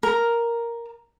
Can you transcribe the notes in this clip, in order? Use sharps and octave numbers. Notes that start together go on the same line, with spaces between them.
A#4